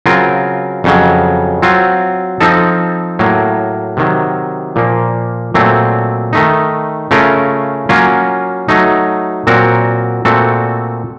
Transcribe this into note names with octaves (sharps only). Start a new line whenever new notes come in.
C#3 F#3 C4 F4 A#4
F2 C#3 F#3
F#3 C4 F4
F3 C4 D#4 A4
A2 F#3 A#3
C3 D#3 F#3
A#2 F3 A#3
A#2 F#3 A3 C4
D#3 A3 D#4
C#3 A3 C#4 F4 A#4
F#3 A#3 C#4 F4
F#3 A3 D#4
A#2 F#3 C4 F#4 A#4
A#2 A3 C4 F#4 A4